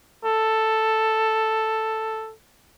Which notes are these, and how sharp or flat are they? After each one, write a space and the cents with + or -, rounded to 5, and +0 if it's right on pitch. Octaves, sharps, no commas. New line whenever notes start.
A4 +5